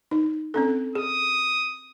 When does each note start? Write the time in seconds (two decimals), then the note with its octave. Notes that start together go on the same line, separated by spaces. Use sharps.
0.11 D#4
0.54 C4 C#4 A4
0.95 G#4 D#6